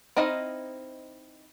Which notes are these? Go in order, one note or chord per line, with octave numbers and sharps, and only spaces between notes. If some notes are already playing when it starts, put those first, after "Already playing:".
C4 D#4 E4 D#5 F5